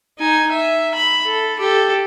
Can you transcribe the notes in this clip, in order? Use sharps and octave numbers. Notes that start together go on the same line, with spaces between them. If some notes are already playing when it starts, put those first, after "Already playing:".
D#4 G#5
E5
B5
A4
G4 A4